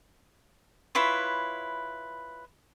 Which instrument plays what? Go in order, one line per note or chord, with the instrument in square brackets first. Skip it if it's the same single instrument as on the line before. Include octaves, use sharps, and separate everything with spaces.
[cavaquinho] E4 F4 B4 C#5